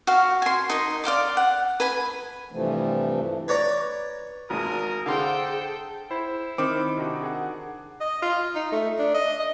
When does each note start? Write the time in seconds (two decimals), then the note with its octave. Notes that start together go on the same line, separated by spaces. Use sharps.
0.07 F#4 F5
0.42 G#5 C6
0.70 D#4 A#4 C6
1.04 D5 F5 C6 D6
1.37 F#5
1.80 B4 G#5 B5
2.52 G2 C3 E3 F3 A3
3.48 B4 C#5 D5 A#5
4.50 G#1 G#3 A#4 D#6
5.06 D3 G#4 A4 C5 F5 G5 C6
6.11 E4 C5
6.58 D#3 C4 D6
6.97 C3 D4 D#4 F#4
7.23 G#4 F#5
8.01 D#5
8.22 F4
8.55 D#4
8.72 A3
8.99 D4
9.14 D#5
9.40 D#5